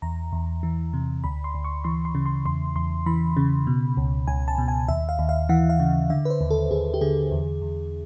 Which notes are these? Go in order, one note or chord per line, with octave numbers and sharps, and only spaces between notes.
E2 A#5
E2
E3
C3
D2 B5
C6
D2
C#6
E3 C6
C6
C#3
C6
E2 C6
E2 C6
E3 B5
C#3
B2
C#2
C#2 G#5
A5
B2
G#5
D#2 E5
F5
D#2
F5
E3 F#5
F5
C#3
D3 E5
B4
C5
D#2
A4
D#2 G#4
G4
D3 G#4
E2
E2